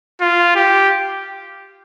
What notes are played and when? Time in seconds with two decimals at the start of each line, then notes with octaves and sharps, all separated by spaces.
0.21 F4
0.56 G4